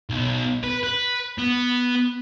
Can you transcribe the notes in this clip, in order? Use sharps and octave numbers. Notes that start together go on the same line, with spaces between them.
B1
B4
B4
B3